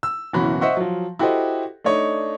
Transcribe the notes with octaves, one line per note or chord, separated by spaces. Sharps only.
E6
F#1 B2 E3 C#4 F#4 B5
C5 D#5 E5 F#5 C#6
F3 F#3
E4 F#4 G4 A4 C5 D#5
A3 D4 D#4 C#5 D#5